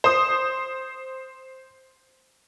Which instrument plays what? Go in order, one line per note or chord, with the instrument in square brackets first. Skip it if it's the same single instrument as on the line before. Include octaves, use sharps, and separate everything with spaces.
[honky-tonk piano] C5 D#6